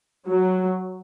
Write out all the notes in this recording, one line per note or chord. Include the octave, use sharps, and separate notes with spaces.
F#3